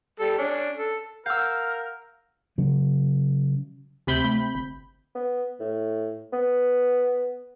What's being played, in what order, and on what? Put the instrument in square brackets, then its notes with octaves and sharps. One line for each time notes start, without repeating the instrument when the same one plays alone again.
[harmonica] G3 A4
C#4 D4
A4
[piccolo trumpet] A#4 [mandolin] F5 E6 [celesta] F#5 G6 [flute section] F6
[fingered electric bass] C#3 F#3
[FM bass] D2 [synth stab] C3 B5 G6
[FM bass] A3
G1
[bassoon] B3
A2
B3